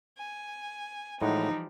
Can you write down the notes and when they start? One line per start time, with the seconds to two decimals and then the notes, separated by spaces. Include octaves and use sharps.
0.19 G#5
1.22 A2 E3 F3 G3 G#3 D#4 F#5